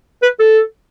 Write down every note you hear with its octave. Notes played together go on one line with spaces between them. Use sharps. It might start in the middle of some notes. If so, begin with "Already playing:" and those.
B4
A4